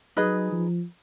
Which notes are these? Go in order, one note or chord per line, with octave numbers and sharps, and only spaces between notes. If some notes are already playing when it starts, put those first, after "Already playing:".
F#3 D#4 G#4 B4 D#5
F3